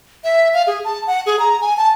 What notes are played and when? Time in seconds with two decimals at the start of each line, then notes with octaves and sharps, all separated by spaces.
0.24 E5
0.54 F5
0.67 G#4
0.85 A5
1.07 F#5
1.26 G#4
1.39 A#5
1.61 G#5
1.77 A5